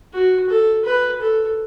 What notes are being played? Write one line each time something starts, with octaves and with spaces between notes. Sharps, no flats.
F#4
A4
B4
A4